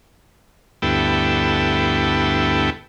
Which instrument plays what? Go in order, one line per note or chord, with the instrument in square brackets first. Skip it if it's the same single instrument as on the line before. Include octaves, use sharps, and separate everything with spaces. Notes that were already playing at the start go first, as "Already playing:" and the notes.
[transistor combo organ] D2 G2 B3 E4 A4 G5